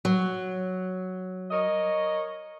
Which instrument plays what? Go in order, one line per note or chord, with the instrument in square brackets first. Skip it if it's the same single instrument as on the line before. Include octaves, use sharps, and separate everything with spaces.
[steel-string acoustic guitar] F#3
[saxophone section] A#4 C#5 D#5